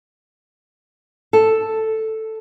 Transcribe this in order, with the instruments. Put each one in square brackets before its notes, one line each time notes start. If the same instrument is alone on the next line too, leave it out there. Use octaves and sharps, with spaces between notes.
[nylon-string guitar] A4